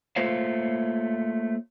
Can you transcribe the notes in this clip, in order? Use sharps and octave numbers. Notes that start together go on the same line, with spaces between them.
A3 A#3 F4 C5 C#5 F5